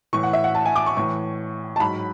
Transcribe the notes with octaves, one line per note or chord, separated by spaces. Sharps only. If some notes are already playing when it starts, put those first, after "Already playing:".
A2 E3 C#6
F#5
E5
F#5
A5
G#5
D6
C#6
A2 E3 C#6
A5
G#2 F#3 B5